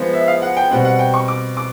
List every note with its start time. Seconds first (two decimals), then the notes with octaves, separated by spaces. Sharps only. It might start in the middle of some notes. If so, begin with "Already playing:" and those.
Already playing: F3 G#3 B3
0.13 E5
0.27 F5
0.42 F#5
0.57 G5
0.70 B2 G3 C4 F#5
0.85 F#5
0.99 G5
1.14 C#6
1.28 D6
1.57 D6